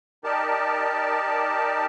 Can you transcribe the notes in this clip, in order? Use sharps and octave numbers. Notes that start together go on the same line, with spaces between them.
D#4 G4 A#4 D5 A5